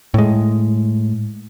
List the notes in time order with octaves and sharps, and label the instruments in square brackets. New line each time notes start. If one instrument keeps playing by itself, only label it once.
[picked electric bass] A2 G#3